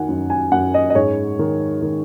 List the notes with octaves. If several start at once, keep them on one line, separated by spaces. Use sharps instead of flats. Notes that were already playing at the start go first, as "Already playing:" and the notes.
Already playing: D#3 F#5 G#5
F#2
G#5
F#2 F#5
D#5
D#5
G#2 C#5
D#3
D#3